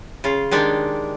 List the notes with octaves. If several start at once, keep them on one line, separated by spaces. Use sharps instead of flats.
C#3 F4
D#3 G#3 D4 G4